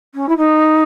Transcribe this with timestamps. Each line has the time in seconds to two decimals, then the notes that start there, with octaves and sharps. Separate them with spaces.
0.14 C#4
0.28 E4
0.37 D#4